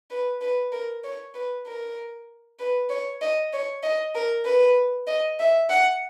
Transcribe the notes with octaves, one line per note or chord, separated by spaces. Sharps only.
B4
B4
A#4
C#5
B4
A#4
B4
C#5
D#5
C#5
D#5
A#4
B4
D#5
E5
F#5